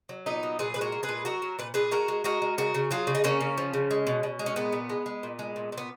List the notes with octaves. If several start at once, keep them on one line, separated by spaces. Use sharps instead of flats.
F#3
A#2 B3 D#4
F#3
A#2 G#4 B4
G#3 B4
F#4 A#4
G#3
G#4 B4
A#2
F#3 F#4 A#4
F#3
A#2 B4
A#2 G#4 B4
G#3 F#4 A#4
G#3
G#3 F#4 A#4
G#3
C#3 F#4 A#4
C#3
F#3 F4 G#4
C#3
D#4
C#3 A#3 C#4
C#3
F3
C#3
G#3
B2
B2
G#3
C#4
A#2 B3
A#2
G#3
G#3
A#2
G#3
A#2
A#2
B3